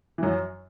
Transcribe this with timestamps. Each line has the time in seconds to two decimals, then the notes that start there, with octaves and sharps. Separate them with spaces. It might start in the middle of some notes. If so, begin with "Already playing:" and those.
0.18 E3
0.23 F#2 F#3